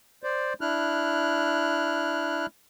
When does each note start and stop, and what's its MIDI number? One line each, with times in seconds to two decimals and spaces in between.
0.23 0.53 72
0.23 0.53 74
0.61 2.46 62
0.61 2.46 64
0.61 2.46 89
0.61 2.46 90